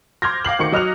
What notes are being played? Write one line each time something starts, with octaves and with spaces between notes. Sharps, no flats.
C6 D6 F6 G6 G#6 A#6
F5 D6 C7 F#7
D2 D#3 C#6 C#7
F#3 D#5 F6 F#6 F7